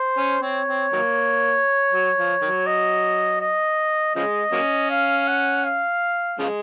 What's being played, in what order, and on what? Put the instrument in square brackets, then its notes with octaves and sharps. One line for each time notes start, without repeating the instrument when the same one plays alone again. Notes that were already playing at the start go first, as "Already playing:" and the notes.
Already playing: [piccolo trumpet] C5
[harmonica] C#4
[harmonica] C4 [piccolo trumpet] C#5
[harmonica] C4
D#3 F#3 A#3
F#3
F3
D#3 F#3
[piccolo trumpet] D#5
D#5
[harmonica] C#3 F3 G#3 [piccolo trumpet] D#5
[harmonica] F#3 A#3 C#4
[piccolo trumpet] F5
F#5
F5
[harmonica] C#3 F3 G#3